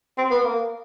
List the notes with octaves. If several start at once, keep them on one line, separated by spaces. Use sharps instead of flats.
C4
B3
A#3